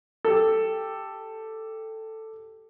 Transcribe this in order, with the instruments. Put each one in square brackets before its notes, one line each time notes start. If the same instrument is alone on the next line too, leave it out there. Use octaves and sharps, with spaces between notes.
[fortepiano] G4 A4